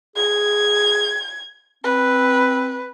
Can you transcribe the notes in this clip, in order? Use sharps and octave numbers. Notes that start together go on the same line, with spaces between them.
G#4 G#6
C4 B4